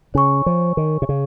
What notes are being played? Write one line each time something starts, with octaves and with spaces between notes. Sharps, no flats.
C#3 C#5 G#5 C#6
F3
D#3
C3
C#3